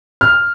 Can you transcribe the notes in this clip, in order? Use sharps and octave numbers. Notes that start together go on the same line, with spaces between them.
F6